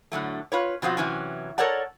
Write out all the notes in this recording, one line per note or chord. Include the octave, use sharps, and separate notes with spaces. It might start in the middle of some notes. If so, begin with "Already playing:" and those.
A2 D3 F#3 A3
F4 B4 C#5
B2 F3 C4 F4 F#4
C3 E3 F#3 C#4
A4 A#4 C#5 D5 F#5 A5